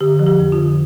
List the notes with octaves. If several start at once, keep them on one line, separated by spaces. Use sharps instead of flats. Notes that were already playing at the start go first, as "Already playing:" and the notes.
D3 G4
F3
G4
F2
F4
D3